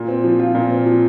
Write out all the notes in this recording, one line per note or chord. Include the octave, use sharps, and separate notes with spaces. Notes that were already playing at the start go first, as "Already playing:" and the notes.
Already playing: A#2
C4
F3
F4
A#2
C4
F3